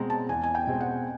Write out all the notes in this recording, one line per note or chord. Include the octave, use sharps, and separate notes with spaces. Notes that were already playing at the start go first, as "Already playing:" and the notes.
Already playing: B2 G#3 C4 A#5
A5
E2 G#5
G#5
G5
B2 G#3 C4
F#5